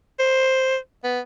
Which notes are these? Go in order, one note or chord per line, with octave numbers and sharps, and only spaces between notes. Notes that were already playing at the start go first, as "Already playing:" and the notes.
C5
B3